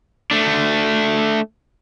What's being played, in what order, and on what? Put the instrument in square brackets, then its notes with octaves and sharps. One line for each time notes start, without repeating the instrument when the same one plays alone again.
[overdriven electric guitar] A3 D4